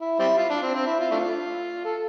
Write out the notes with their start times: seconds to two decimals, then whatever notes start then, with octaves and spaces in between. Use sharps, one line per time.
0.01 E4
0.19 G3 C4 E4
0.37 F4
0.50 D4
0.62 C4
0.75 C4
0.86 E4
0.99 F4
1.11 A3 D4 F4
1.85 A4